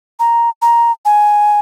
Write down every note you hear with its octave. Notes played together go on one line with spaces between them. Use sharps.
A#5
A#5
G#5